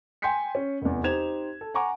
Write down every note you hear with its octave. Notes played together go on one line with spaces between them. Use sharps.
G5 G#5 C6 G6 B6 C#7
C#4
F1 E2
D#4 G4 C5 G#6 E7 F7
A4
F#5 G#5 A#5 C#6 D6